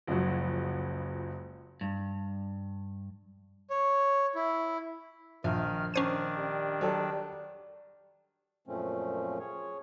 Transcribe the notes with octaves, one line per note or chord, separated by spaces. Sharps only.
F#1 C#2 F3 F#3 F#4
G2
C#5
E4
A#1 D#3 F6
D#3 C#4 D4 C5 D#7
G3
F#3 A4
F#2 A#2 F3 A3 C4 C#4
G#4 C#5